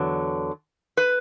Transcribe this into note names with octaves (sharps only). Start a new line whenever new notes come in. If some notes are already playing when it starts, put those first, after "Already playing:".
Already playing: E2 D3 F#3
B4